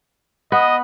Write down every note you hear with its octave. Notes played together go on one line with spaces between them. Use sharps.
B3 D#5